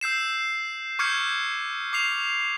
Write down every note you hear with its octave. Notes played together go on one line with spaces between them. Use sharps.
E6 G6 C7 E7
C#6 D6 F6 G6 G#6 C#7
D6 C7 F7